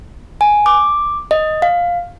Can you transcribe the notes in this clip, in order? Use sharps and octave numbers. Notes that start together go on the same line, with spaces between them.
G#5
D6
D#5
F5